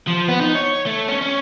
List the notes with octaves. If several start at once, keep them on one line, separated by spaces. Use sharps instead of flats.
F3
B3
D#4
C#5
A3
C#4
C#4